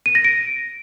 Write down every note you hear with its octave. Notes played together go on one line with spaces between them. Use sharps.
D#7
A#6
D7